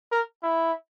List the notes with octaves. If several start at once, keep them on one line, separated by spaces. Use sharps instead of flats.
A#4
E4